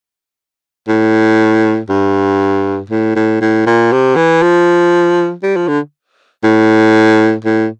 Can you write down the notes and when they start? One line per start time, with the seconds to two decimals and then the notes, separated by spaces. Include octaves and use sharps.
0.88 A2
1.89 G2
2.90 A2
3.16 A2
3.41 A2
3.66 A#2
3.92 C3
4.16 E3
4.42 F3
5.43 G3
5.56 F3
5.68 D3
6.44 A2
7.45 A2